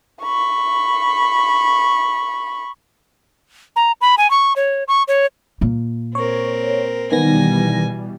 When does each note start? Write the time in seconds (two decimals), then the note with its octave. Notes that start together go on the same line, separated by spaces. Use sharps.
0.22 B5 C#6
3.76 A#5
4.01 B5
4.18 G#5
4.31 C#6
4.56 C#5
4.88 C#6
5.08 C#5
5.61 A#2 A#3
6.15 C4 A#4 C#5
7.12 B2 D#3 E3 G3 B3 G#5 A#6